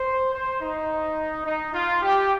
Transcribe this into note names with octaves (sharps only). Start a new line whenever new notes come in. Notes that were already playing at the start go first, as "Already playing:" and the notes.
Already playing: C5
C5
D#4
D#4
F4
G4